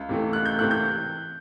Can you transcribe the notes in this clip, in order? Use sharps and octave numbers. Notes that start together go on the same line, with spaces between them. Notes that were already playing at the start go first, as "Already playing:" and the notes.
Already playing: C#2
C3 E3 A3
C#2 F#6
G6
C3 E3 A3 F#6
G6